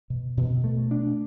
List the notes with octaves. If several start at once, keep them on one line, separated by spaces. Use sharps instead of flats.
B2
B2
A3
D4